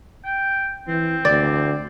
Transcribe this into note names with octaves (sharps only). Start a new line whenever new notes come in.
G5
E3 C4
D2 D5